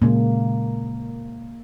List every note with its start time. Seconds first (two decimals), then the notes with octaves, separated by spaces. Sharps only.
0.02 A#2 C#3 G#3 A#3